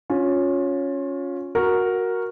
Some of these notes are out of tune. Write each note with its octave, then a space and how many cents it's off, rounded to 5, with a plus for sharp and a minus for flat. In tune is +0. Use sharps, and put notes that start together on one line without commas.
C#4 +0 F4 +25
F#4 -5 A#4 +0